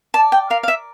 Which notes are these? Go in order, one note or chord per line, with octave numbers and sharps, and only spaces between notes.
D5 A5
G5
A#4 F5
F5
E5